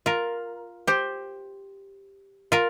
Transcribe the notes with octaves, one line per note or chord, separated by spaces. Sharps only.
F4 A#4
G4 C5
F4 A#4